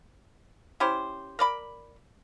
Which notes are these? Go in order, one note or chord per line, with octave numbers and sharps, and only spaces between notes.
C#4 E4 G4 C5
A#4 D5 B5